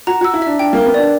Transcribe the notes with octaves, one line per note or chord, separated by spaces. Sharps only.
F#4 A#5
F#4 E6
E4
D4 E5
D4 G5
A#3 A#4
B3
D4 D5